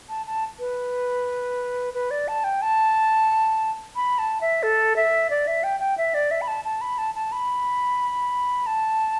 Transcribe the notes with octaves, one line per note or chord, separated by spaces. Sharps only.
A5
A5
B4
B4
D5
A5
G5
A5
B5
A5
E5
A4
E5
D5
E5
G5
G5
E5
D5
E5
B5
A5
A5
B5
A5
A5
B5
A5